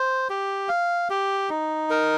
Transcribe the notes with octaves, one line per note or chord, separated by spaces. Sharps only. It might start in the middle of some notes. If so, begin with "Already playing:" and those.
Already playing: C5
G4
F5
G4
D#4
A#4